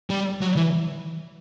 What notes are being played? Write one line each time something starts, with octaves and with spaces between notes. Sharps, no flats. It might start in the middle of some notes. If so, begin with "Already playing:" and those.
G3
F#3
E3